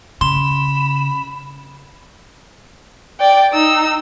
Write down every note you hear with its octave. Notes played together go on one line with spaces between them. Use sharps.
C#3 B5 C6 E7
D5 G5
D#4 E6